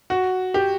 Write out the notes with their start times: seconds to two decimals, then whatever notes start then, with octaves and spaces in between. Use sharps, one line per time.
0.10 F#4
0.54 G4